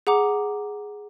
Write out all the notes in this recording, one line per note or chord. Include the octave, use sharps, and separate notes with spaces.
G#4 F#5 A#5 D6